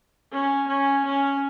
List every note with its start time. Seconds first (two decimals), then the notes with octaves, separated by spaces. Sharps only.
0.32 C#4
0.68 C#4
1.05 C#4